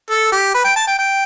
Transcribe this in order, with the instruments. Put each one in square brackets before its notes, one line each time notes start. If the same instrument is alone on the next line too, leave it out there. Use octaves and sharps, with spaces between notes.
[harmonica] A4
G4
B4
G5
A5
G5
G5